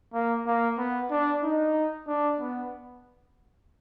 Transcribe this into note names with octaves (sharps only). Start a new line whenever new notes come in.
A#3
A#3
B3
D4
D#4
D4
B3